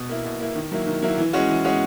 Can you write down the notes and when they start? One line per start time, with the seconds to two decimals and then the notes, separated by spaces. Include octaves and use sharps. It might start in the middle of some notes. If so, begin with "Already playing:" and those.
Already playing: B2
0.09 A#3 E4
0.25 B2
0.40 A#3 E4
0.55 D#3
0.72 F#3 A#3 E4
0.87 D#3
1.02 F#3 A#3 E4
1.18 E3
1.33 G#3 C#4 F#4
1.49 E3
1.64 G#3 C#4 F#4